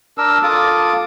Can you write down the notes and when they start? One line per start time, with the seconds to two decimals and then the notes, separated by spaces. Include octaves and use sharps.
0.18 D4 A#4 E6
0.43 F4 A4 D6 D#6